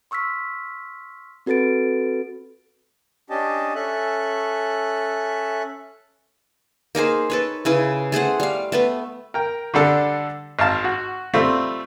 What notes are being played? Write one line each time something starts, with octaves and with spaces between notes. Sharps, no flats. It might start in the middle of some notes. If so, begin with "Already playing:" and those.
C6 C#6 E6 F6 B6
C4 F#4 A4 B4 A6 D7
C#4 D4 G4 D#5 A5
C#4 A4 E5 F#6
A#3 D#4 G#4 C5
A4 B4 C#5
C#3 E4 B4
A3 G#4 C5 F#5
G3 F5
A3 B3 B4
A#4 G5
D3 G3 D4 A4
G#1 F5 A5
F#4
G3 A3 C4 F4